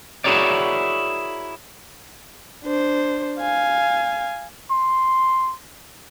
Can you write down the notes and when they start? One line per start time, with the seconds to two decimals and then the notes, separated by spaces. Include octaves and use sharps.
0.24 E4 F#4 G#4 A#4 C#5 D5
2.64 D4 C5
3.41 F5 G#5
4.71 C6